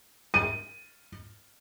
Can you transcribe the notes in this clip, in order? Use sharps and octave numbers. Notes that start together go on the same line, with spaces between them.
D#7